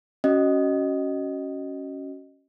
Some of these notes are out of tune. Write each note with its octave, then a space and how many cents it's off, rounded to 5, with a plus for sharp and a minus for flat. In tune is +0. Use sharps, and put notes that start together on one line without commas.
C#4 +0 F#4 +25 D#5 -5